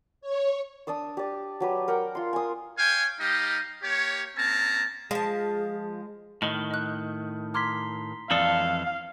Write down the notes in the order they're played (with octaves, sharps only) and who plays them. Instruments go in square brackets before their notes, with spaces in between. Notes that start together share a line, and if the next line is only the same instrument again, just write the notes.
[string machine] C#5
[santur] D4 D5 D#6 E6
G4 D5
F#3 G4 B4
A#4 F#5 G5
F4 C6
G#5 D#6
[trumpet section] C#5 F5 G5 G#5
G3 D#4 G4 D#5 F5
A#3 G4 C#5
A#3 C4 C#4 A5 A#5
[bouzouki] F3 A5 [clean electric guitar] G#3 [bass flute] G#4
[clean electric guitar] A2 D#3 [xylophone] D#5 F6 F#7
[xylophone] D#5 F#6
[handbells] A#5 C6 B6 [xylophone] D6 F6 G#6
[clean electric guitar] F2 E3 A4 [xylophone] D5 A5 D#6 [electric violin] F5